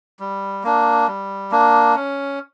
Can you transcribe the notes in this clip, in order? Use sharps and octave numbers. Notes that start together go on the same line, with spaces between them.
G3
A#3 D4
G3
A#3 D4
C#4